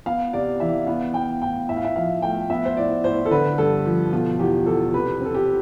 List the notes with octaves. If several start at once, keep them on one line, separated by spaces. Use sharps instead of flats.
B3 F5
C3 D5
E3 E5
B3 F5
B3 G5
A2 G5
A2 E5
F5
E5
F3 F5
A3 G5
B3 E5
C5
A2 D5
A2 C5
A4
D3 B4
G2 A4
F3
B2 F4
E2 G4
E2 A4
C3 B4
C4 A4
G4